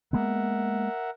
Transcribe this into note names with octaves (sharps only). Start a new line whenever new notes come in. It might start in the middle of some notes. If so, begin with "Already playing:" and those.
G#3 A#3 B3 A#4 E5 F#5